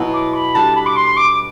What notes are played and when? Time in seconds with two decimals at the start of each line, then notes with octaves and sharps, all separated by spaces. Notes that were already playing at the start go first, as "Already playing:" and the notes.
Already playing: B2 F#3 B3 E4
0.13 D6
0.34 B5
0.55 G3 D4 A4 A5
0.75 B5
0.86 D6
0.96 C6
1.17 D6